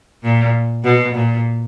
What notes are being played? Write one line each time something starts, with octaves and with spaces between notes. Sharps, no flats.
A#2
B2
A#2